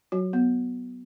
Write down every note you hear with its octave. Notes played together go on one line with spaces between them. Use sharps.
F#3 F#4
B3